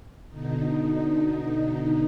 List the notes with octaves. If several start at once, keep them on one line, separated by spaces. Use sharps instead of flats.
B2 D3 D#4